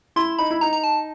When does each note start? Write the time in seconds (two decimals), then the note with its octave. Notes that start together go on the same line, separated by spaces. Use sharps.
0.16 E4 C6
0.39 D#4 B5
0.51 E4
0.61 D#4 A#5
0.73 A#5
0.84 A5